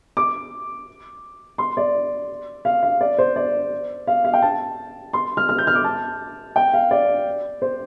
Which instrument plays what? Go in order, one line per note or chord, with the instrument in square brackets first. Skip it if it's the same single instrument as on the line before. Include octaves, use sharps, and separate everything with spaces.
[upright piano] D6
C6
D5
F5
F5
D5
C5
D5
F5
F5
G5
A5
C6
F6
F6
G6
F6
D6
A5
G5
F5
D5
C5